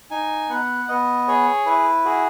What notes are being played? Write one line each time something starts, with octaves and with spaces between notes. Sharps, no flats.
D#4 G#5
B3 F#5
B3 D#5
G#4 C#5
E4 B4
F#4 G#4